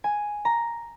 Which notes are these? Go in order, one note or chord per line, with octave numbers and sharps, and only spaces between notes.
G#5
A#5